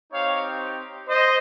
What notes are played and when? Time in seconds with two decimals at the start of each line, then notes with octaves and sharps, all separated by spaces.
0.13 C4 D#4 G4 C#5 F5
1.08 C5 D#5